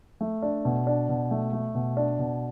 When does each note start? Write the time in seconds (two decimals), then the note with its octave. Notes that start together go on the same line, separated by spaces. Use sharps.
0.21 A3
0.42 D4
0.65 B2
0.87 D4
1.09 B2
1.31 A3
1.53 A3
1.75 B2
1.97 D4
2.19 B2